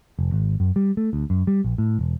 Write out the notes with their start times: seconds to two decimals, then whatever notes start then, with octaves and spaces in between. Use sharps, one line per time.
0.19 F1
0.32 G#1
0.60 F#2
0.76 G3
0.97 A3
1.13 D2
1.30 F#2
1.47 G3
1.64 A#1
1.78 A2
1.99 E1